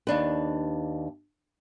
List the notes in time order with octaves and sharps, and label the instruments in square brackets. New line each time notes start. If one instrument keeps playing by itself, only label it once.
[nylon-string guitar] D#2 D4 B4